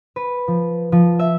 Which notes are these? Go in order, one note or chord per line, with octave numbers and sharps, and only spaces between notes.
B4
F3
F3
E5